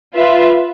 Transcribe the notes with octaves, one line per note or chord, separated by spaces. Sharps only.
F4 B4 E5